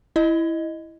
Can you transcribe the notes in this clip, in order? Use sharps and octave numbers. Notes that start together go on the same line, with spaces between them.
E4 D#5